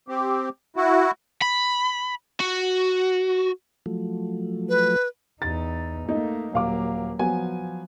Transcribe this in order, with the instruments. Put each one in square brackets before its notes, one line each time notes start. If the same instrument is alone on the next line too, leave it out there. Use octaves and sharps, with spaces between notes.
[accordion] C4 G4
E4 F#4
[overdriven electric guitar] B5
F#4
[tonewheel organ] F3 F#3 A3
[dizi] B4
[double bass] E2 D#4 [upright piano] A6
[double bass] A3 A#3 [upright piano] D#4
[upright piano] D#1 F5 D6 [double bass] F#3 A#3
[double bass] F3 [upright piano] F#3 B3 G#5